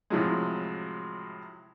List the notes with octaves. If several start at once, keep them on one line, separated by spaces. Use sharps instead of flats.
A2 C3 F3 F#3 G#3